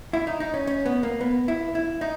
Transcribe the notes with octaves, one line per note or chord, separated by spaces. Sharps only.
E4
D#4
D#4
C#4
C#4
B3
A#3
B3
E4
E4
D#4